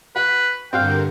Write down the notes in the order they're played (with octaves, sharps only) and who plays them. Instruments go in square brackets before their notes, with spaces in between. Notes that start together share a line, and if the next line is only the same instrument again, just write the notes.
[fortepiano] F#4 [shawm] B4
[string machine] G2 D3 A#4 [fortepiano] C4 F#4 F5 [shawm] G5